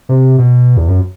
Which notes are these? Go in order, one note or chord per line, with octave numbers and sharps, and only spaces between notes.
C3
B2
E2
F#2